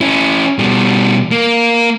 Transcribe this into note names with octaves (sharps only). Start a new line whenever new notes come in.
C#4 E4
B2 G3
A#3